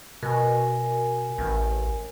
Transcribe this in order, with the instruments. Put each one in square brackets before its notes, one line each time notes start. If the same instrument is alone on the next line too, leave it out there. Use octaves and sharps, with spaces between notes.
[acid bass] B2 [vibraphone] A#4 G#5
[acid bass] A1